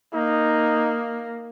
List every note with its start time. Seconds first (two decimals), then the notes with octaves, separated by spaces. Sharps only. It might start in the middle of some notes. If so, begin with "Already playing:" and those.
0.14 A#3 D#4